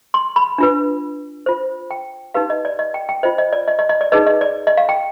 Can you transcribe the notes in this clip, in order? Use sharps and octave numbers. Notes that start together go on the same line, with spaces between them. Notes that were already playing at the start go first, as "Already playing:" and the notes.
C6
B5
D4 F4 B4
F4 C5
G5
D#4 G4 B4 F5
D#5
D5
D#5
G5
G5
F4 C5 D#5
D#5
D5
D#5
D#5
D#5
D5
D#4 G#4 B4 D#5
D#5
D5
D#5
F5
G5